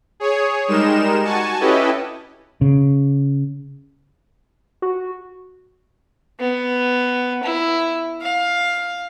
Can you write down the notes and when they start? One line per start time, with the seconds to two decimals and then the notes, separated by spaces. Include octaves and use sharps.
0.20 G#4 C#5
0.68 G3 G#3 D#4 A#4 E7
1.24 F#4 G#5 A5 C#6
1.60 C#4 E4 G4 A4 B4 D#5
2.61 C#3
4.82 F#4
6.39 B3
7.43 E4
8.21 F5